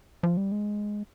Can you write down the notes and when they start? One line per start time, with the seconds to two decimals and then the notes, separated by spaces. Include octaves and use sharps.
0.23 F3
0.37 G3
0.52 G#3